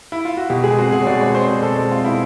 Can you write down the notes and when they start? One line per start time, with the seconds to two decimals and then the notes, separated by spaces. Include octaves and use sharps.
0.12 E4
0.25 F4
0.37 F#4
0.50 B2 G4
0.64 G#3 G#4
0.78 C4 F#4
0.92 B2 G#4
1.02 C#5
1.06 B2 D5
1.20 G#3 C#5
1.35 C4 C5
1.49 B2
1.62 B2 A4
1.77 G#3
1.91 C4 F4
2.04 B2 E4